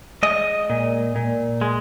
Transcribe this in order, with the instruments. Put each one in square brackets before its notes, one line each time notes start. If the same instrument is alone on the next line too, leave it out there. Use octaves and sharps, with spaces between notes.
[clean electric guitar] G#3 D#5
A#2
A#2
G#3